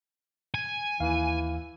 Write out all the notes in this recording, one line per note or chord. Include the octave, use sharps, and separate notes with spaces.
G#5
D#2 E3 F5